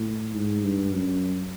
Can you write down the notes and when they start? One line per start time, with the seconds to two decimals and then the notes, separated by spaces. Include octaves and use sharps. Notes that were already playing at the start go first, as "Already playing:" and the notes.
Already playing: A2
0.35 G#2
0.64 G2
0.93 F#2